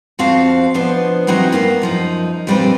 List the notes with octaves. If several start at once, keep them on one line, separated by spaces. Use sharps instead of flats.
F2 F3 C4 F#4 F5 A5
B2 F3 B3 D4 C5
E3 F#3 C4 D#4 F#4
G2 A#3 B3
F#2 F3 D#4
F2 A#2 G3 C4 D4 B4